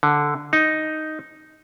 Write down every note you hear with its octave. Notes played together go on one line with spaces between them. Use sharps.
D3
D#4